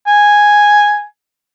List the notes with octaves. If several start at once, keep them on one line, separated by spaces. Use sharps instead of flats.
G#5